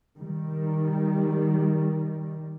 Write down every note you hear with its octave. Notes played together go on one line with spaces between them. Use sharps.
D#3 G3